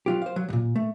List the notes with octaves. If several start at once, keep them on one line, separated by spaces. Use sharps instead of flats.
F#3 F4 G4
C5 F5
F#3
D2 A#2
A3